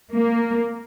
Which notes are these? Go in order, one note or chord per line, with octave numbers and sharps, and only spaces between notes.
A#3